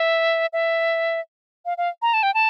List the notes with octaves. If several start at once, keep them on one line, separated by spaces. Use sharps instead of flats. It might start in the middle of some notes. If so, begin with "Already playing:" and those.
Already playing: E5
E5
F5
F5
A#5
A5
G5
A5